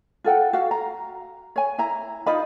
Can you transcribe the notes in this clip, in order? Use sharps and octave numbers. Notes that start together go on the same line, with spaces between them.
F4 A4 F#5 G5
F#4 F5
A#5
C#5 G#5
E4 A#5
D#4 F4 D#5 B5